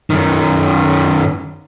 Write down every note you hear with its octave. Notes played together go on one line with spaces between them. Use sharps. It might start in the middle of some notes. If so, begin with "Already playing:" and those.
F#2 D#3